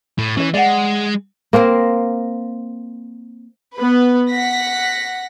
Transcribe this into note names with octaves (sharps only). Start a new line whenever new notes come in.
A2
E3 C#4 C#5
G#3 D5 F#5
A#3 C4 A#4 C5
B3 B4
F#5 A#6 B6